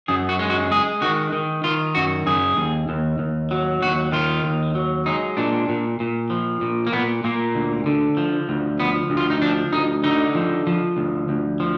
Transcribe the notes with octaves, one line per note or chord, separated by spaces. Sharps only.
F#2 G#4
F#4
G#3
F#4
G#3 G#4
D#3 F#4
D#3
D#3 F4
F#2 F#4
F#2 G#4
D#2
D#2
D#2
F#3
D#2 F#4
D#3 F4
D#2
F#3
G#3 D#4
A#2 D4
A#2
A#2
F3
A#2
A#3
A#2 B3
A#2 A#3
D2
D3
F3
D2
F3 B3
D2
F4
D#4
F3 D4
D2 D#4
D3 D#4
F3
F3
D2
D2
F3